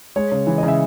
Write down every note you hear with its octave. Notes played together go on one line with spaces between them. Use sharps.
G#3 C#5
C#3
E3
D#5
C#3
E5